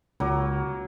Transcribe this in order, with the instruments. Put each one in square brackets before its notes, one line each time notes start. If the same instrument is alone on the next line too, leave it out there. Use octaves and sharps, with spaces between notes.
[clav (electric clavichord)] C#2 [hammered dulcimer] F#3 A#3